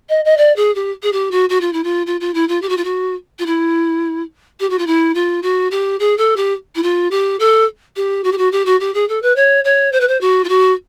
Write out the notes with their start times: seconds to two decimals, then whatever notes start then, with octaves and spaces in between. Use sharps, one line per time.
0.09 D#5
0.25 D#5
0.37 D5
0.56 G#4
0.75 G4
1.03 G#4
1.12 G4
1.31 F#4
1.49 F#4
1.61 F4
1.73 E4
1.84 F4
2.06 F4
2.20 F4
2.34 E4
2.48 F4
2.62 G4
2.69 F#4
2.77 F4
2.84 F#4
3.39 F4
3.46 E4
4.60 G4
4.70 F#4
4.78 F4
4.86 E4
5.14 F4
5.42 F#4
5.71 G4
5.99 G#4
6.17 A4
6.36 G4
6.75 E4
6.83 F4
7.11 G4
7.39 A4
7.96 G4
8.24 F#4
8.32 G4
8.38 F#4
8.52 G4
8.65 F#4
8.80 G4
8.94 G#4
9.08 A4
9.22 B4
9.36 C#5
9.64 C#5
9.92 C5
10.00 B4
10.08 C5
10.21 F#4
10.44 F4
10.48 F#4